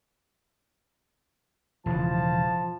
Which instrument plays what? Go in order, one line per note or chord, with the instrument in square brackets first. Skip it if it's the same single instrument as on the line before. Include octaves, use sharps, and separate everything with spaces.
[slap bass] E1 C#3 E3 [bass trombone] F3 [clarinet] A5